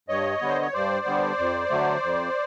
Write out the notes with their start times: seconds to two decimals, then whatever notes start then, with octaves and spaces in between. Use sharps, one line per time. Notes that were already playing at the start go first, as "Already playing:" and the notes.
0.09 G2 C#5 D#5
0.42 D3 G3 B3
0.49 C5
0.61 C#5
0.73 G2 C5 D5
1.06 D3 G3 B3
1.38 F2
1.71 D3 F#3 A3
2.03 F2